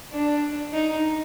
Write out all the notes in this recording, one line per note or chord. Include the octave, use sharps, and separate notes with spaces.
D4
D#4